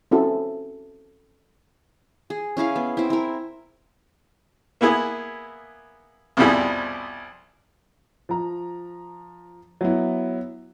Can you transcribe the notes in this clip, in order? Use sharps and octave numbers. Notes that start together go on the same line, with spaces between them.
C4 C#4 E4 F#4 A4
G#4
C#4 E4 G#4 F5
B3
C4 E4
E4 A#4
A#3 B3 E4 G#4
C2 F2 B2 G3 E4 G#4
F3 A#5
F#3 B3 E4